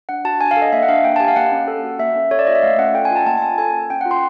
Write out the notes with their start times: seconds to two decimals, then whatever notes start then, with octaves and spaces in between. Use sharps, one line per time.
0.09 D4 F#5
0.25 F#4 A5
0.41 D4 G#5
0.51 F5
0.57 A4
0.62 D#5
0.72 A#3 E5
0.83 F#5
0.89 D4 F5
1.04 A#3 G5
1.16 A5
1.20 G4 G#5
1.28 F5
1.36 A#3 F#5
1.52 C#4
1.68 A4
1.84 F#4
1.99 A#3 E5
2.16 C#4
2.31 A4 C#5
2.39 D5
2.47 F4 D#5
2.55 E5
2.63 A3 F5
2.79 C#4 F#5
2.94 A4 G5
3.05 G#5
3.11 F4 A5
3.26 A#3 A5
3.37 G#5
3.42 C#4 A5
3.58 A4 G#5
3.74 F4
3.90 C#4 G5
4.01 F#5
4.06 F4
4.11 C6